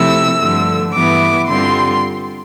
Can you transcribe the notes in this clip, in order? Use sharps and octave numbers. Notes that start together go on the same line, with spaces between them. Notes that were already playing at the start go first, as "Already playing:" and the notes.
Already playing: C3 F3 A3 E4 E6
G2 D3 F3 A3
G2 E3 B3 E4 D6
G2 D3 G3 C4 F4 C6